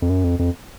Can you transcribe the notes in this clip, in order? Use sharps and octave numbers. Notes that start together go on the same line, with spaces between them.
F2
F#2
F2
F2